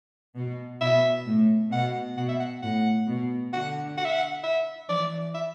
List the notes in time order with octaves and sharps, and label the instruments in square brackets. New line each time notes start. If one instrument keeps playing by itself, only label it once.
[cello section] B2
[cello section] B2 [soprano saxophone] E5
[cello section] A2
[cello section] B2 [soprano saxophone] F#5
[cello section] B2 [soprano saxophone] F#5
[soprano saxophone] E5
F#5
[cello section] A2 [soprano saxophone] F#5
[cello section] B2
[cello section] D3 [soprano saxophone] F#5
[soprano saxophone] F#5
E5
F#5
E5
[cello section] E3 [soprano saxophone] D5
[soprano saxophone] E5